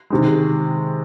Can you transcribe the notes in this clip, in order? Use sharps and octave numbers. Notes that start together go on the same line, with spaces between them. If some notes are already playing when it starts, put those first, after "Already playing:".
C3 D#3 G#3